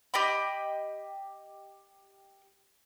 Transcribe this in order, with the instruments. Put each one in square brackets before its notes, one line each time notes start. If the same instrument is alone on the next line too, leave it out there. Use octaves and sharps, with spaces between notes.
[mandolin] G4 D#5 G5 B5